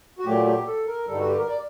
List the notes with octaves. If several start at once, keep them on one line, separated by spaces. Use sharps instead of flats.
F#4
A#2 F#3 A3 G4
G4
A4
A#4
G2 D3 G3 A4
D#4
F#4
G4
A#4
D5